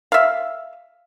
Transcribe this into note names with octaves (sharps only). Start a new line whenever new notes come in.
E5 F5